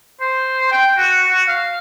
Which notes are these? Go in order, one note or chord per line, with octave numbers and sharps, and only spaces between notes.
C5
G5
F#4
F#4
F5